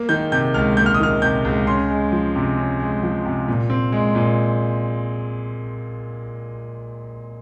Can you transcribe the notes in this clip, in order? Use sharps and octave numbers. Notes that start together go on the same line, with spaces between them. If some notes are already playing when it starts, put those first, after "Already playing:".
Already playing: A#3
D#3 G6
C3 G6
C#2 F6
A#3 G6
F6
D#6
D#3 F6
C3 G6
C#2
C#4 C6
G#3
F3
C3
C#4
G#3
F3
C3
A#2
C4
G#3
A#2